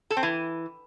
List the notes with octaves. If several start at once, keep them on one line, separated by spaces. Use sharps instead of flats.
A4
C4
E3